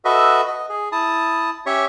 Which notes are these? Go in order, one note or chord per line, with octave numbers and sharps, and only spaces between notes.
F#4 A4 B4 D#5 E5
D#5
G#4
E4 A5 D#6
C#4 G4 C#5 E5 C#6